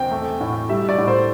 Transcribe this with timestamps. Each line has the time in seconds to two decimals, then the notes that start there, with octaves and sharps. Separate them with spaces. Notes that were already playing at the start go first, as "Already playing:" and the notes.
Already playing: E2 C4 G5
0.11 A3
0.40 A2
0.69 G3 E5
0.89 D5
0.98 A2
1.08 C5